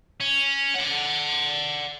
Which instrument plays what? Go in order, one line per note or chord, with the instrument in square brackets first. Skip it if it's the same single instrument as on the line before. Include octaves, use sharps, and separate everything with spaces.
[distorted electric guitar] C#4
D5 F#5